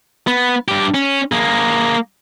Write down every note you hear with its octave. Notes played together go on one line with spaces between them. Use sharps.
B3
G2 G4
C#4
A#3 G#4